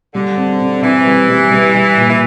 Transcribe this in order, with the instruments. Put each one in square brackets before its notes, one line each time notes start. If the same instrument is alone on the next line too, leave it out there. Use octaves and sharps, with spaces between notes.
[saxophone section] D3 [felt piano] G3
[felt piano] C4
C4
[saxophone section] E3 [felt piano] C4
[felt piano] G3
G3
G3
G3
A#2
[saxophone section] E3